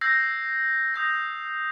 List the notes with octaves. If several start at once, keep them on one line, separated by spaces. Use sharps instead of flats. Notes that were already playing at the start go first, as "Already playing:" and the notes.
E6 G6 G#6 A#6 C7
D#6 G6 A#6